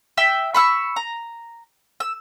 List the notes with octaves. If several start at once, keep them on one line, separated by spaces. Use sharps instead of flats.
E5 G5 E6
B5 C#6 E6
A#5
E6